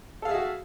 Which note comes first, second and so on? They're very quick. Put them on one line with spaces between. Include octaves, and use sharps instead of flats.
A4 F5 G#4 E5 F#4